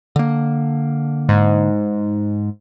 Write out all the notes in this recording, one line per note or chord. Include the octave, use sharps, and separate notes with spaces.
D3 A#3
G#2